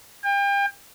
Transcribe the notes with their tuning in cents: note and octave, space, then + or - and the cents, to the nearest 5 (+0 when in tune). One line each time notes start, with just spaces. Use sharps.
G5 +35